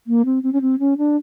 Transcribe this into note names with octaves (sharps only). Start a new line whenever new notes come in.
A#3
C4
C4
C#4
C4
C#4
D4